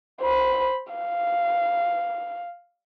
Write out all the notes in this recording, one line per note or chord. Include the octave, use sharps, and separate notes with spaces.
C5 B5
F5